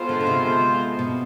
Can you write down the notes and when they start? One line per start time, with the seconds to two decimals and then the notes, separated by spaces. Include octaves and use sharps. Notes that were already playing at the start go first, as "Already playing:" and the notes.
Already playing: G#3 B3 F4 A4 C5
0.09 D3
0.21 D3
0.27 C3
0.99 B2